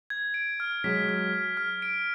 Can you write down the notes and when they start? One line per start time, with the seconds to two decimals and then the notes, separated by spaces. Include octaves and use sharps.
0.10 G#6
0.34 D7
0.60 F6
0.84 F#3 G#3 B6
1.09 F6
1.34 F6
1.57 F6
1.82 D7